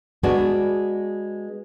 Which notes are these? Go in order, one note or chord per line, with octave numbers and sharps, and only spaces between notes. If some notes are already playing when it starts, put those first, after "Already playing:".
G#3 B3 D4 F#4